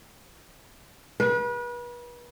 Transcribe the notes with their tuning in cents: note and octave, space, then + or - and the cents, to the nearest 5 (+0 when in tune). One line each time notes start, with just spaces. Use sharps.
B4 -35